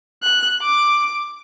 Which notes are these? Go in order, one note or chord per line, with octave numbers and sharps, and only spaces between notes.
F#6
D6